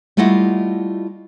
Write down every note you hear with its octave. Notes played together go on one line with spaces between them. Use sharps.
G3 A3 E4 F4 D#5 F#5